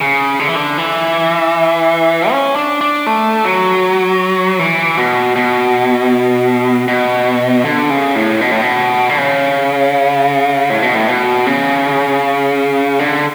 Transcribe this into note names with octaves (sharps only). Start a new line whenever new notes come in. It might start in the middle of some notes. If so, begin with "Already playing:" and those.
C#3
D3
E3
D3
E3
C#4
D4
D4
A3
F#3
E3
B2
B2
B2
D3
C#3
A2
B2
A2
B2
D3
C#3
A2
B2
A2
B2
C#3
D3